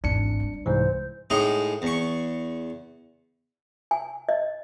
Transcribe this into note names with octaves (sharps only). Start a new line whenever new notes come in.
G#1 E2 D4 C#7
G3 C#4
C2 G#2 E3 C5
A2 G#3 D#4
E2 C#6
G#5
D#5